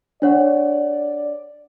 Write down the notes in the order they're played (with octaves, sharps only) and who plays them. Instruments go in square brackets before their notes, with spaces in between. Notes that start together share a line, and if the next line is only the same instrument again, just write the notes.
[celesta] D4 C#5 F#5 [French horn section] D5